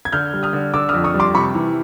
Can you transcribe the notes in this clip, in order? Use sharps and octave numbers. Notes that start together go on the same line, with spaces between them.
G#6
D3 F6 G6
G3
D#6 F6
D3
D3 D6 E6
D#6 F6
F2
C#6 D#6
G3
C6 D6
C3 B5 C#6
E3